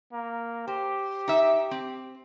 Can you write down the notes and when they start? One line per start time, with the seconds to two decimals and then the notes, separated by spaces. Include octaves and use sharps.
0.13 A#3
0.68 G4 C5
1.28 D#4 E5
1.71 C4